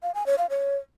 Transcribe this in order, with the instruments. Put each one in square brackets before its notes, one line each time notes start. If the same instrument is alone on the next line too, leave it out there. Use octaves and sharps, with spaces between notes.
[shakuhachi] F5
G#5
C#5
F5
C#5